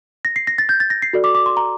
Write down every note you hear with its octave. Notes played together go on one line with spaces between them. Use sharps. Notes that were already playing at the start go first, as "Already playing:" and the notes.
A#6
C7
A#6
A6
G6
A6
A#6
C7
F#4 A4 D5
D6
D6
C6
A#5